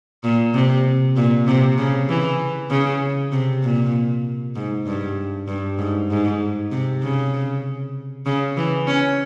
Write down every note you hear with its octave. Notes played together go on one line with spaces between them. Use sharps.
A#2
C3
A#2
C3
C#3
E3
C#3
C3
A#2
G#2
G2
G2
G#2
G#2
C3
C#3
C#3
E3
C#4